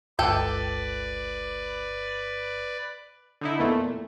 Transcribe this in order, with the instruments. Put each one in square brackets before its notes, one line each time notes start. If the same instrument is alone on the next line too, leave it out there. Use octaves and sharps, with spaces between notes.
[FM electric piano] G1 D6 [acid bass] C#2 [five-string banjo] A4 G5 [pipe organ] B4 D5
[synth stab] D3 D#4 E4
E2 A#2 A3